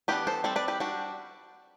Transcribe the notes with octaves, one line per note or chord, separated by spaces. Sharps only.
E3 B3 D4 G4 B4
A4 C5
G3 C4 A4 C5
B4 D5
G4 B4
G3 D4 F#4